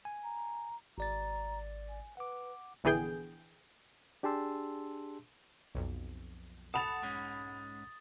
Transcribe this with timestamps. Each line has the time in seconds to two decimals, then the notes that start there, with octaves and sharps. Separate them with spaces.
0.05 G#5
0.23 A#5
0.98 G#1 D5 A#5 A6
1.89 G#5
2.17 B4 F#5 D6
2.84 A#1 D3 E3 B3 G#4 G5
4.23 D4 G4 G#4 A5 C6 E6
5.75 B1 F2
6.74 A4 F#5 B5 D#6 A6 F7
7.03 G#2 G#3 C#4